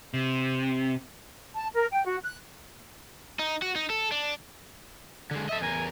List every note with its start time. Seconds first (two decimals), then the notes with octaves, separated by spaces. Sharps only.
0.14 C3
1.54 A5
1.74 A#4
1.93 G5
2.06 F#4
2.23 F#6
3.39 D#4
3.62 F#4
3.75 D#4
3.90 A4
4.12 D4
5.31 D3 G#3
5.49 A4 D#5 E5
5.61 E2 A#4 G#5